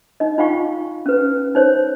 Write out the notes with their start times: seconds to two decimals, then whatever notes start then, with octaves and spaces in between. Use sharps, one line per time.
0.20 D#4 D#5
0.38 D#4 F4 F5 G5 C#6
1.06 C#4 B4
1.55 D#4 C5 C#5